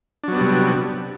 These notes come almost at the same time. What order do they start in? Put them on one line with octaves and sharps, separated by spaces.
D4 F#3 B3 G3 C3